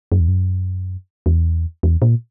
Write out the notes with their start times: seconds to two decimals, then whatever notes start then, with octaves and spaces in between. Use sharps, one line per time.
0.12 F#2
0.20 E2
0.28 F#2
1.26 E2
1.83 E2
2.02 A#2